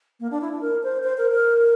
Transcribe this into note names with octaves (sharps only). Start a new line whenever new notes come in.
A#3
D4
E4
D4
A#4
C5
C5
A#4
A#4